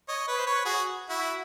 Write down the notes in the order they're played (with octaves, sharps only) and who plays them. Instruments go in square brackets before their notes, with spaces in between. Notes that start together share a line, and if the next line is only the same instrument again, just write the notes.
[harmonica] C#5 D#5
B4 C#5
C5
B4 C#5
F#4 G#4
E4 F#4